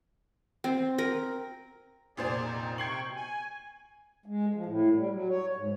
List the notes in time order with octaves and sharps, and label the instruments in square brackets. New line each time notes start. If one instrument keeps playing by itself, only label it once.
[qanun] C4
A#4
[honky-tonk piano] F1 A#2 C5 [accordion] G#4 D5
[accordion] C4 D#4
[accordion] C3 G5 C#6 [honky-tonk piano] G#6 C7 F#7
[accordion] B2
G#5
[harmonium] G#3
F3
A2
G3
F#3
C#5
G#2